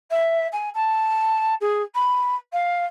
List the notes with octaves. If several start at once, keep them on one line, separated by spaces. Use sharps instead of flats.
E5
G#5
A5
G#4
B5
F5